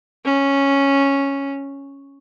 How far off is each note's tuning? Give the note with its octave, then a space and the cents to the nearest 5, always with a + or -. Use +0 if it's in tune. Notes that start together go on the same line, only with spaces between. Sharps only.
C#4 -5